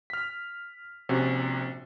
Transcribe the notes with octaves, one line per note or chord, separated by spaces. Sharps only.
F6 B6
A#1 C3 C#4 F#4